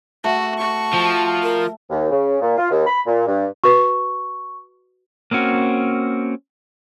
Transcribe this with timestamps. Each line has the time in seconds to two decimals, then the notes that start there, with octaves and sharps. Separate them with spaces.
0.24 A3 F#4
0.57 F#4 C#6
0.94 F3 A5
1.43 A#4
1.90 D#2
2.10 C#3
2.41 A#2
2.57 F4
2.70 D#2
2.86 B5
3.06 A#2
3.27 G2
3.64 F#4 B4 C#6
5.31 A#3 C4 C#4 F#4